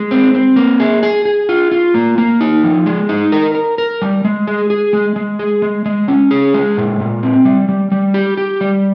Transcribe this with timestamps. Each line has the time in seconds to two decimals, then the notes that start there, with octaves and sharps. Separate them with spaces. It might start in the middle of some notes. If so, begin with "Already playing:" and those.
Already playing: G#3
0.11 C4
0.34 C4
0.56 A#3
0.80 G#4
1.03 G#4
1.25 G#4
1.49 F4
1.72 F4
1.94 A#3
2.18 A#3
2.41 D#4
2.63 F3
2.86 G#3
3.09 D#4
3.32 A#4
3.55 A#4
3.78 A#4
4.02 G3
4.25 G#3
4.47 G#4
4.70 G#4
4.93 G#3
5.16 G#3
5.39 G#4
5.62 G#3
5.86 G#3
6.08 C#4
6.31 G#4
6.54 G#3
6.77 A#2
7.00 A#2
7.23 C4
7.45 G3
7.69 G3
7.92 G3
8.14 G4
8.38 G4
8.61 G3